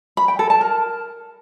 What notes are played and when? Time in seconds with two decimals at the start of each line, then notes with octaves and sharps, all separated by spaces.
0.17 B5
0.28 G5
0.39 A4
0.50 A5
0.61 A#4